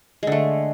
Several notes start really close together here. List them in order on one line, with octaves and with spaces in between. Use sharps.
G#3 D3 A3